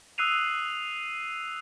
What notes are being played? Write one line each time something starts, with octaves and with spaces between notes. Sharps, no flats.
D#6 E6 F#6 C7 D#7 F7